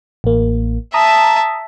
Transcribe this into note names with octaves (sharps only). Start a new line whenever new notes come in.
A1 A#3
E5 A5 A#5 D#6